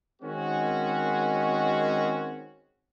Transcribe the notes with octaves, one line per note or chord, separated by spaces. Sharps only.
D#3 G#3 C4 C#4 F#4